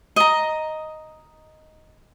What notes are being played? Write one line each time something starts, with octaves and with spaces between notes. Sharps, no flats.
D#5 A#5